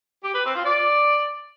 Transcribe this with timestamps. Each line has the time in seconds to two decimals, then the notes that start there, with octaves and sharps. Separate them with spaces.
0.24 G4
0.34 B4
0.45 C4
0.55 F4
0.65 D5